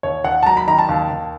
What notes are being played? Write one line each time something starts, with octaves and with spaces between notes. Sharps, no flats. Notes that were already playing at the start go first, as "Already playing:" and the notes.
D#2 C#5
D#2 F#5
A5
F#3 A#5
B5
D#3 A#5
A5
D#2
D#2